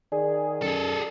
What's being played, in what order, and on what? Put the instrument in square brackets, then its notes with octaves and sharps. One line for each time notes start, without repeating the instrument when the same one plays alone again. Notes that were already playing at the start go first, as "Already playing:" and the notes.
[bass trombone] D#3 [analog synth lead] G#4 [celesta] D5
[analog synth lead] F#2 [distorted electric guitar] G#4 A4